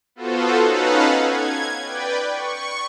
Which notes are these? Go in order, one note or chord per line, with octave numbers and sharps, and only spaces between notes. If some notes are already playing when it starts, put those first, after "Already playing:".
B3 F4 F#4 A4 C5
C#4 D#4 A4 B4 F5 F#5
G#6
B4 D5 G5
C#6